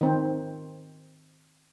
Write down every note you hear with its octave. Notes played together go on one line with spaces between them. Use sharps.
D#3 C4